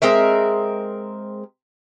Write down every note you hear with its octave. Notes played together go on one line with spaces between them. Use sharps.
G#3 C4 A#4 E5